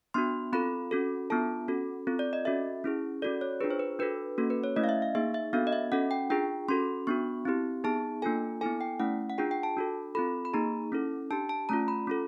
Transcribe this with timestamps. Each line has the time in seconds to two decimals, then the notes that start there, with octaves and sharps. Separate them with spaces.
0.14 B3 D4 F#4 C6
0.53 C4 F4 A4 B5
0.91 C#4 F#4 A4
1.30 B3 D4 F4 A4 A5
1.68 C#4 F#4 A4
2.07 C4 F4 A4
2.19 D5
2.33 D#5
2.45 C#4 F#4 A4 E5
2.84 C#4 E4 G#4
3.22 C#4 F#4 A4 D5
3.41 C#5
3.61 D4 F4 G#4 B4
3.70 C5
3.79 B4
3.99 D4 F#4 A4 B4
4.38 A#3 C#4 F#4 A4
4.50 B4
4.64 C#5
4.76 A3 C#4 E4 D#5
4.84 F5
4.89 E5
5.02 F5
5.15 A#3 D#4 G#4 E5
5.34 E5
5.53 B3 D4 F#4 A4 F5
5.67 D#5
5.73 E5
5.92 C#4 F#4 A4 F#5
6.11 G5
6.30 D4 F4 G#4 G5
6.68 C#4 F#4 A4 C6
7.07 B3 D4 F#4 C#6
7.45 C4 E4 G4
7.84 B3 D#4 G#4 A5
8.22 A#3 D4 F4 A4 G#5
8.61 B3 E4 A4 G#5
8.81 G5
9.00 A3 C#4 E4 F#5
9.30 F#5
9.38 D4 F4 G#4 G5
9.51 G5
9.63 A5
9.77 D4 F#4 A4
10.15 C4 F4 A4 B5
10.45 B5
10.53 A#3 D#4 G#4 A#5
10.92 C#4 E4 A4
11.31 D4 G4 A5
11.49 A5
11.69 A3 C#4 F4 A#5
11.88 B5
12.07 C#4 F4 A4